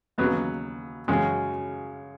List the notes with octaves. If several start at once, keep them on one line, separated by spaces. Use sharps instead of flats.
D#2 C#3 F#3 B3
F#2 C#3 G#3 C#4